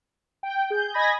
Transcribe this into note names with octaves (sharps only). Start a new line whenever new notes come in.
G5
G#4 G6
D#5 G#5 B5 G#6 A#6